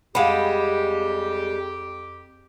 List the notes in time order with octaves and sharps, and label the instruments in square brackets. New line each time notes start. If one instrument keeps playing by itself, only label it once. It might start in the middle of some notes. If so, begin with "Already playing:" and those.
[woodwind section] F2 G4 [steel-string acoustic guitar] G3 G#3 [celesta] F5 F#5 B5